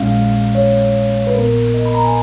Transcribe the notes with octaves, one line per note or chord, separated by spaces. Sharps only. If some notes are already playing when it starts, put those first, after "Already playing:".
Already playing: A#1 A#2 G#3 C#4 F5
C#5
B4
A#1 A#2 F#3 B3 A#4
D#5
B5
A#5
G#5